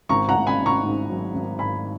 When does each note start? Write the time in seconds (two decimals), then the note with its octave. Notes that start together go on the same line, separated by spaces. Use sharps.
0.09 G#1 A#5 C#6
0.29 F#5 A#5
0.35 G#1
0.47 G#5 B5
0.60 G#1
0.66 A#5 C#6
0.85 G#2
1.09 F#3
1.35 G#1
1.59 G#2 G#5 B5